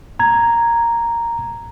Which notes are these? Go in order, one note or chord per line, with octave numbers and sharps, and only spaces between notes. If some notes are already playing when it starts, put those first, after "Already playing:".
A#5 G#6